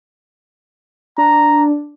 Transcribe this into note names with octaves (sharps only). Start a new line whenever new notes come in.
D4 A#5